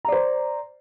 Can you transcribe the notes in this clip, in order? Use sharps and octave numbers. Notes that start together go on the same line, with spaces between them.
C5 D5 A#5